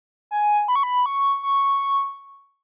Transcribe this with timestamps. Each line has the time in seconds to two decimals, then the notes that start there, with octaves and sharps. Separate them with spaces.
0.31 G#5
0.68 B5
0.76 C#6
0.83 B5
1.06 C#6
1.43 C#6